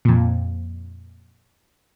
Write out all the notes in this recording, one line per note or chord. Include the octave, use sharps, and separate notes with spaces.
F2 A#2